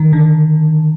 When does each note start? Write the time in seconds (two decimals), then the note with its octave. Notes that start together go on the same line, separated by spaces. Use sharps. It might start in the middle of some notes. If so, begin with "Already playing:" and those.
Already playing: D#3
0.13 D3